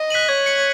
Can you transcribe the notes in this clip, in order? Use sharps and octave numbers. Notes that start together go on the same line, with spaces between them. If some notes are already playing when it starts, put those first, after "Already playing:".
Already playing: D#5
F#6 B6 D#7 F#7
C#5 G#6
C#7 F#7